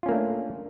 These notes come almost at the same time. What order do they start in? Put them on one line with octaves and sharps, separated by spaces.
F4 C#4 A#3 A3 D4